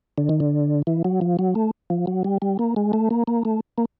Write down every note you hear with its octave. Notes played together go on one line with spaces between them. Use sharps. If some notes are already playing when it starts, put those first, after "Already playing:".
D3
D#3
D3
E3
F#3
F3
F#3
A3
F3
F#3
G3
G3
A#3
G#3
A3
A#3
A#3
A3
A#3